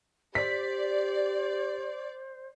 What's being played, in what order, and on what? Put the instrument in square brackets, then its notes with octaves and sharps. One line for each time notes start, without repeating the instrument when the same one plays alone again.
[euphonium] G4 [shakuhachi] C5 [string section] D5 [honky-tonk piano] B6